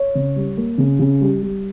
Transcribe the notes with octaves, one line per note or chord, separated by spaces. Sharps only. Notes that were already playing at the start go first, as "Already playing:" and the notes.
Already playing: C#5
C#3
G3
A#3
C#3
C#3
G3
G3